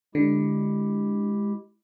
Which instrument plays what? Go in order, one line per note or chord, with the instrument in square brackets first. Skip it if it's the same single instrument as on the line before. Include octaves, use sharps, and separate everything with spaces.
[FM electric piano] D3 [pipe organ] G#3 E4 G4